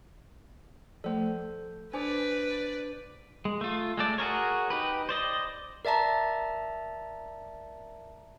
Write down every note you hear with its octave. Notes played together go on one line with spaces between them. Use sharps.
F3 A3 A4 C5
D4 B4 C5 D5 G#5 D6
G#3
A3 F4
G#3 A3 D5
F#4 G#4 A#4 C#5
D#4 G4 B4
C5 D5 D#5
A#4 D5 E5 A5 A#5